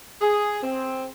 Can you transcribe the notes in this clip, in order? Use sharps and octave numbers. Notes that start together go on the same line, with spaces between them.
G#4
C4